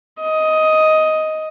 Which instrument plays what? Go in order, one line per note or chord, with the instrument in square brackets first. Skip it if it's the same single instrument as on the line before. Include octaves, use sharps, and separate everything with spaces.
[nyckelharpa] D#5